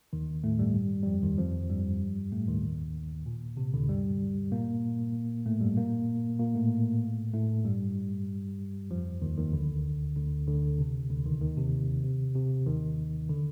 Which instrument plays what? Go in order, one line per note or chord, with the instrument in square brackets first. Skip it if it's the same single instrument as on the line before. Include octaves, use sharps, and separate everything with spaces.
[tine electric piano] D#2 D#3
A2 A3
G2 G3
G3
F2 F3
D#2 D#3
F2 F3
G2 G3
A2 A3
D#2 D#3
A#2
C3
D2 D3
G2 G3
A#2 A#3
A2 A3
G2 G3
A#2 A#3
A#2 A#3
A2 A3
A2 A3
G2 G3
F2 F3
D#2 D#3
D#2 D#3
D2 D3
D2 D3
D2 D3
C3
D2 D3
D#2 D#3
D#2 D#3
C3
C3
C3
D#2 D#3
D3